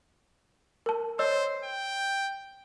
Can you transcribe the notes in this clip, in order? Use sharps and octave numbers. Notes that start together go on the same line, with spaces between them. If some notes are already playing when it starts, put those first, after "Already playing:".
A#4 A5
C5 C#5 D#5 E6
G5